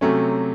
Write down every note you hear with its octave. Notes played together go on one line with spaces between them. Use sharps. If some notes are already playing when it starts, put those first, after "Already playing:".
C3 F#3 A3 C#4